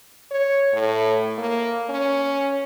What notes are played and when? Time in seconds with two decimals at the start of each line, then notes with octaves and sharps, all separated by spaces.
0.31 C#5
0.73 A2
1.38 A#3
1.89 C#4